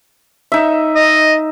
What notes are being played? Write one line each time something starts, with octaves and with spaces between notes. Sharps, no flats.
D#4 E5
D#5